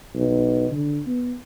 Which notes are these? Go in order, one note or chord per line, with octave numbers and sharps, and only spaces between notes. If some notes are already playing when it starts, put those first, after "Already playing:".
B1
D3
B3